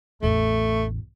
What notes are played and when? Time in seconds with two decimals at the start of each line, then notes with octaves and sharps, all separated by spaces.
0.23 A1 E2 A3